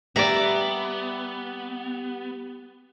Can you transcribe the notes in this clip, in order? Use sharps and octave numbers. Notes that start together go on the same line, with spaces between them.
G3 B3 D5 E5 A#5